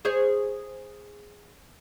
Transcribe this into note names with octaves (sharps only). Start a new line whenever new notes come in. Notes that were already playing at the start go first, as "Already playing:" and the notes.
G#4 C5 C#5